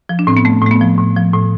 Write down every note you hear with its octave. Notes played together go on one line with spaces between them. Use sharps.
F3
D4
A2 C4
B3
A3
A2 A3
B3
F3
A2
F3
A2